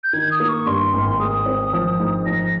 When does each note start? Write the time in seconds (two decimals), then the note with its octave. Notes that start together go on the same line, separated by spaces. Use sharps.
0.04 G6
0.13 D#3 G#6
0.31 D#6
0.40 A#3
0.49 C#6
0.66 G2 C6
0.94 G#1
1.19 G#3 D#6
1.46 C4
1.73 F3
2.00 G#2
2.26 F3 A#6